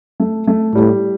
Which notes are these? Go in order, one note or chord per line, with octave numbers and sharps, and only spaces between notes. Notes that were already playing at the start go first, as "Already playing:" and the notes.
A3
A3
A2 G3